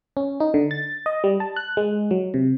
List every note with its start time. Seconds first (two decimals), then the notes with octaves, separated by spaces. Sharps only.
0.17 C#4
0.40 D#4
0.54 D3
0.71 A6
1.06 D#5
1.24 G3
1.40 A5
1.56 F#6
1.77 G#3
2.11 F#3
2.34 C3